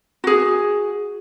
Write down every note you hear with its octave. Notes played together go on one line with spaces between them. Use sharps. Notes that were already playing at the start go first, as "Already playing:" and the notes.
F#4 G#4